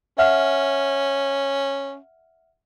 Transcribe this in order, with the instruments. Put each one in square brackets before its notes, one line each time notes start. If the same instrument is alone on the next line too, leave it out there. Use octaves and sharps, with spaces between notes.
[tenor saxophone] C#4 [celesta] E5 F#5 F6